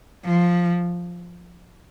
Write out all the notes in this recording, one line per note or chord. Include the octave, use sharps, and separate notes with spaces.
F3